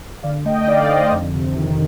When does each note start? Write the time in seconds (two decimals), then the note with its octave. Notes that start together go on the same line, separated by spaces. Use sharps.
0.23 D3 D5 F5
0.45 A3 D#5 G5
0.67 D#4 D5 F5
0.89 D3 C5 D#5
1.11 F2
1.34 C3
1.55 D#3